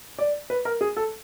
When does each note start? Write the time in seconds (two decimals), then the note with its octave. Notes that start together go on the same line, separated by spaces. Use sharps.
0.19 D5
0.50 B4
0.65 A#4
0.81 G#4
0.97 A4